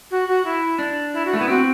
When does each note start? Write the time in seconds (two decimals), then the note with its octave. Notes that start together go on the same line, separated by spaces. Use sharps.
0.11 F#4
0.28 F#4
0.45 E4
0.79 D4
1.14 E4
1.25 F#4
1.33 A3
1.37 B3 E4
1.48 C4 F#4